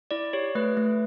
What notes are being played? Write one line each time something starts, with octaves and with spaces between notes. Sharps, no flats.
E4 D5
G4 C#5
A3 B4
A3